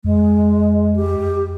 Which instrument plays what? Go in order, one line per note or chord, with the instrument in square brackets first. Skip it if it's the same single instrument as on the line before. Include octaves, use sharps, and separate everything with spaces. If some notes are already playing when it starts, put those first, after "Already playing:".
[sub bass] F2 [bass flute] G#3
[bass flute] G4